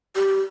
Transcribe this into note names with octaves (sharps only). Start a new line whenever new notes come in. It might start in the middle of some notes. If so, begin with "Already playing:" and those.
G4